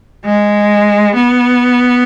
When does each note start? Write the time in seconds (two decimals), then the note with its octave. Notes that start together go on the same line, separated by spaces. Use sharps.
0.25 G#3
1.15 B3